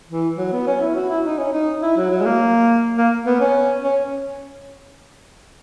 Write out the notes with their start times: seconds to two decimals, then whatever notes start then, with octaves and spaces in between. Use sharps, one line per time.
0.09 E3
0.38 F#3
0.52 B3
0.67 C#4
0.81 E4
0.95 F#4
1.09 E4
1.25 D#4
1.38 C#4
1.52 D#4
1.82 E4
1.97 F#3
2.10 F#3
2.21 G#3
2.25 A#3
2.98 A#3
3.26 B3
3.40 C#4
3.84 C#4